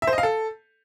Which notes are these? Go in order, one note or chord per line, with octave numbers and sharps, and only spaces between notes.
E5
C5
D#5
F5
A4